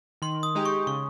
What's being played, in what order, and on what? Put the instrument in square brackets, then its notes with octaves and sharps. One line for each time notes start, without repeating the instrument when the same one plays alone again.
[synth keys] D#3 [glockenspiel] C6
[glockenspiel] D#6
[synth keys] G#3 D#4 G4
[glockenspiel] C#6
[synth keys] C#3 [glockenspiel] C#6